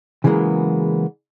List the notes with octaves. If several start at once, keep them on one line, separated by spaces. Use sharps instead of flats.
C#3 E3 F#3 G#3 A#3 B3